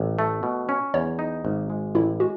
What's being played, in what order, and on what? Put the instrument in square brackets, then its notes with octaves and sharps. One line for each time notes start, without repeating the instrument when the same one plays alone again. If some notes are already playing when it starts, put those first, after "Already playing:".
Already playing: [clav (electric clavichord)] A1
A3
B2
C#4
[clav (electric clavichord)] E2 [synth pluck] C#5
[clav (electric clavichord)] D#4
G#1
G#3
[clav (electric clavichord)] A1 [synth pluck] E4
[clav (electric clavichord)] G#3 [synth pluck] F#4